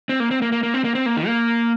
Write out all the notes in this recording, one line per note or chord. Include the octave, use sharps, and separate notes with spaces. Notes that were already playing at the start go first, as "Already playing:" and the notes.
C4
A#3
C4
A#3
A#3
A#3
C4
A#3
C4
A#3
D#3
A#3